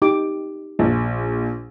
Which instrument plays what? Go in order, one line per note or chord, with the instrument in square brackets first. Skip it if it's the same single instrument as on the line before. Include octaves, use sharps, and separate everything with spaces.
[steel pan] D#4 G4 D6
[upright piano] A#1